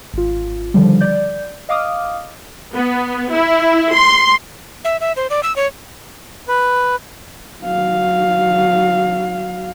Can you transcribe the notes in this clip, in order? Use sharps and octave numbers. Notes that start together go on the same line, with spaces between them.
G#1 F4
D3 D#3 F3 G3
D5 G6
D#5 F5 D6 D#6 F6
B3
E4
C6
E5
E5
C5
D5
E6
C#5
B4
F#3 F5